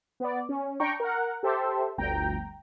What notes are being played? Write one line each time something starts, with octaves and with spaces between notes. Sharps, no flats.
B3 D5
C#4
D4 G5 A#5 C#6
A#4 F#5
G4 A4 C5 E5
G1 D2 G5 A#5